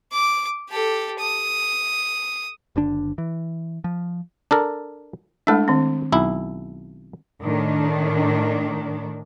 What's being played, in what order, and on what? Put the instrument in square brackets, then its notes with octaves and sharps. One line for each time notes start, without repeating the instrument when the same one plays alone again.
[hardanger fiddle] D6
G4 A4
D#6
[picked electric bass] F#1 D3 D4
E3
F3
[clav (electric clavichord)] D4 A4 A#4
[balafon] G#3 A3 D4 [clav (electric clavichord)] E4 A4
[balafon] D#3 C4
[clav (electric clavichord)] B1 E4
[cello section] A2 D#3 D4